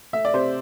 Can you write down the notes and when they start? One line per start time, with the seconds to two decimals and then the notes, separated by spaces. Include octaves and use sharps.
0.13 A3 E5
0.25 D5
0.34 C3 C5